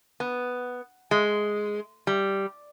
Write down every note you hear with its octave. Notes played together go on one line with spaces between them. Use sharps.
B3
G#3
G3